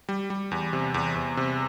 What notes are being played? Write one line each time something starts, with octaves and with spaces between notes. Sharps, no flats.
G3
G3
E2
C3
E2
E2
C3